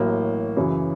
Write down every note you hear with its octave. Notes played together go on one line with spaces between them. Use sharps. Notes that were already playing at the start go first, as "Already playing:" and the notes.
Already playing: A1 A2 F#3 A#3
F#2 C#3 E3